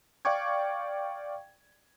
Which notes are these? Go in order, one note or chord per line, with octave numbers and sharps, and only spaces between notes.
D5 F5 G5 C#6 D6 G#6